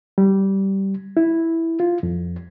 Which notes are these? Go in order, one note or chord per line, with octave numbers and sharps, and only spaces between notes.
G3
E4
F4
F2